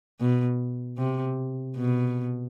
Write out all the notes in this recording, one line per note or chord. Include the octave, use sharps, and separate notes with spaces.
B2
C3
B2